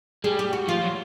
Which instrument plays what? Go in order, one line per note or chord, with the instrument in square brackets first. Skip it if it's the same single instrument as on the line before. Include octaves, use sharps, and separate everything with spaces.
[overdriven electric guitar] G3 [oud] G#4
[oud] G4
F#4
[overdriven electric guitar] F3 [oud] F4
[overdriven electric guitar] F#3